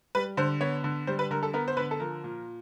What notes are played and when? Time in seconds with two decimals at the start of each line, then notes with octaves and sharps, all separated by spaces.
0.15 G3 B4
0.37 D3 C5
0.61 B3 C#5
0.84 D3
1.07 G3 C5
1.19 B4
1.31 D3 A#4
1.43 A4
1.53 B3 A#4
1.68 C5
1.77 D3 B4
1.91 A4
2.00 F3 A#4
2.24 A#2